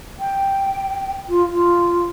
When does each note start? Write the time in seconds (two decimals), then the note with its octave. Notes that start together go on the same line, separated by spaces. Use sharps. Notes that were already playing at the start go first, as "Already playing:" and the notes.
0.19 G5
1.28 F4
1.51 F4